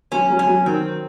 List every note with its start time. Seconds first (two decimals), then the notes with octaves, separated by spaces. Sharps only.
0.12 F#3 C#4
0.30 F#3
0.39 C#4
0.47 F#3
0.66 D#3 C4